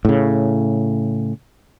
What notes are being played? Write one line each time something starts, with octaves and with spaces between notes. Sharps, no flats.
A2 C#3